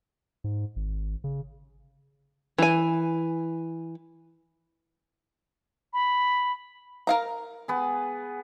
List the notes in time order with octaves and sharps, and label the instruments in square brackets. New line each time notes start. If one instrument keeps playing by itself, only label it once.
[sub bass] G#2
G#1
C#3
[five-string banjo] E3 G#5
[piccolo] B5
[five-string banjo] A#4 F5 A#5
[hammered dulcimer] B3 G#4